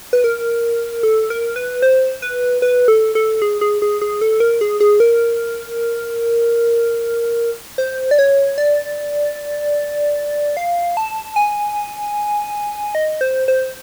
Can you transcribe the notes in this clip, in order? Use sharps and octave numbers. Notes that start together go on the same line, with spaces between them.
B4
A#4
A4
A#4
B4
C5
B4
B4
A4
A4
G#4
G#4
G#4
G#4
A4
A#4
G#4
G#4
A#4
C5
D5
C#5
D5
F5
A5
G#5
D#5
C5
C5